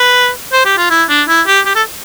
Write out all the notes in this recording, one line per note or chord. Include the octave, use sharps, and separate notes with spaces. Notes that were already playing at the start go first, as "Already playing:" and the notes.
Already playing: B4
C5
G4
F4
E4
D4
E4
G4
G4
A4